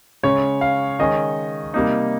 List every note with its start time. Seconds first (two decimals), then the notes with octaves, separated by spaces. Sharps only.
0.23 C#3 G#3 C#4 C#5
0.61 F5
0.99 D#3 G#3 C#4 D#5
1.74 C3 G3 A#3 D#4